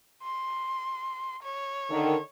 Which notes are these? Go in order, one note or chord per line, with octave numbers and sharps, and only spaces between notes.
C6
C#5
D3 D#3